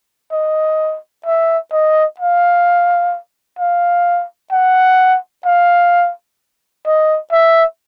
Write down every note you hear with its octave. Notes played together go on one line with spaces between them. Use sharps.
D#5
E5
D#5
F5
F5
F#5
F5
D#5
E5